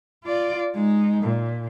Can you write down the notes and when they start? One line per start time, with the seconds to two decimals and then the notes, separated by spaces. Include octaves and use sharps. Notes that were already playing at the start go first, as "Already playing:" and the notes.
0.24 F4 D5
0.74 G#3 D#4
1.23 A#2